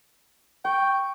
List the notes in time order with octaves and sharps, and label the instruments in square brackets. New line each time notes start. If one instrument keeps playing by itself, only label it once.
[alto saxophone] G5 [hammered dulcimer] C#6